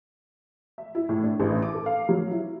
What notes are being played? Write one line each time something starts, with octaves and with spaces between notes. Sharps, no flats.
E5
E4
A2
D4
A1
D6
A4
F5
F#3
E4